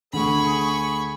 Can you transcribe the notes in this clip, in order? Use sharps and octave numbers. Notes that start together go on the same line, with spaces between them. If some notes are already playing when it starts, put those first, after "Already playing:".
D2 G#4 B5 C#6